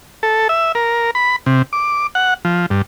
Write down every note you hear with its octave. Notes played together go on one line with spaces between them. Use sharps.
A4
E5
A#4
B5
C3
D6
F#5
F3
G2